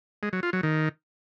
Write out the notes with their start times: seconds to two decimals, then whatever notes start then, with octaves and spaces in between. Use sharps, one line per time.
0.23 G#3
0.33 F#3
0.43 F4
0.53 F#3
0.63 D#3